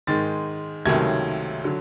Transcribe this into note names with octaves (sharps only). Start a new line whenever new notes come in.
G#2 D#3 G#3 A6
C#2 C3 D#3 F#3 A3 G#6
D3 F#3